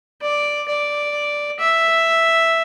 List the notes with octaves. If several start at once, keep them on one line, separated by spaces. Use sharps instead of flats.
D5
D5
E5